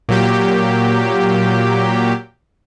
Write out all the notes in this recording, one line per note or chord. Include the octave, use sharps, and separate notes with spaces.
A#2 F#3 G4